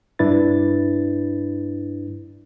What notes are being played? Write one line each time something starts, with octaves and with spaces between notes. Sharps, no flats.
G2 D4 E4 B4 A6